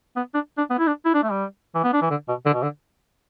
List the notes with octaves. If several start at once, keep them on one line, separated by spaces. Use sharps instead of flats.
B3
D4
D4
B3
E4
D4
E4
D4
A3
G3
E3
B3
D4
E3
D3
B2
D3
B2
D3